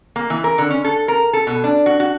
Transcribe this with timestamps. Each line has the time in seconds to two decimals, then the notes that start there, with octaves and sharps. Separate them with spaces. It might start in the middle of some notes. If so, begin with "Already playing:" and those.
0.16 A#3
0.30 E3
0.44 A#4
0.58 D3
0.70 C#4
0.84 A4
1.08 A#4
1.33 A4
1.47 B2
1.64 D4
1.86 F#4
2.00 F#4